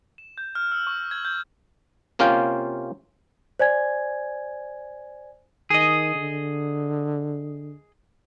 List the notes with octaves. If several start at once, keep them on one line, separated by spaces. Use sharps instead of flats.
E7
G6
F6
E6
C#6
G#6
G6
C3 A#3 C#4 F4 F5 G5
C5 D5 G#5 G#6
D#3 G#4 D#5
D3